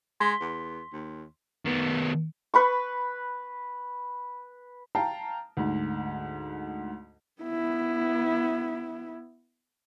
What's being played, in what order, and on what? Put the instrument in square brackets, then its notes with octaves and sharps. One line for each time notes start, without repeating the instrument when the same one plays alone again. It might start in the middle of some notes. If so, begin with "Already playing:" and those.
[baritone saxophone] G#3 [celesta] C6 B6 G7
[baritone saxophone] E2
D#2
[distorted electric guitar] D#3 B3
[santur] B4 B5 C#6
[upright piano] F5 G5 A5 A#5
D2 G#2
[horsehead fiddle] B3 E4